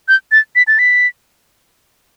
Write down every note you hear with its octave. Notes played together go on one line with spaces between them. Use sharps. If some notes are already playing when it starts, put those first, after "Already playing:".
G6
A6
B6
A6
B6